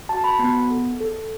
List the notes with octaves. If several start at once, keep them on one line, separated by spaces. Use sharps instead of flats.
F#4 A5
B5
B3
A4
A4